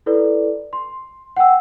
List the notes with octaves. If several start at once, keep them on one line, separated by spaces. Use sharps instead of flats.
E4 A4 B4 D5
C6
F#5 G5 E6